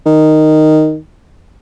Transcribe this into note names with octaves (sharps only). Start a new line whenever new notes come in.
D#3